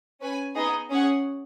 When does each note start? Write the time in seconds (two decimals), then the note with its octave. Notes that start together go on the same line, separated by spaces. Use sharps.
0.21 C#4 B4 G#5
0.55 B3 D#4 G#4 D#5
0.90 C#4 G#4 C#5 F#5